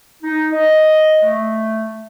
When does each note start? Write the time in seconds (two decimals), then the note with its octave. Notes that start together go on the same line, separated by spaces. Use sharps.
0.23 D#4
0.52 D#5
1.23 A3